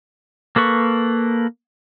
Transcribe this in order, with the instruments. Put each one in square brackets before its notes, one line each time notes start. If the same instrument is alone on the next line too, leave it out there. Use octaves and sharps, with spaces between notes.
[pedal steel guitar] A#3 A4 B4 C#6